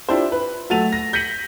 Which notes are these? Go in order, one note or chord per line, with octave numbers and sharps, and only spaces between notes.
D4 E4 F4 G4 C5
B4
F#3 A3 F#4 A6 D#7 F7
A#6
G6 A#6 B6 C#7 D#7 F#7